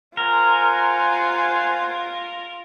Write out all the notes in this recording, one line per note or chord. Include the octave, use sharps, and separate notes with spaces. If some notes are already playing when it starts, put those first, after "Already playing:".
F4 A#4 C5 F#5 G#5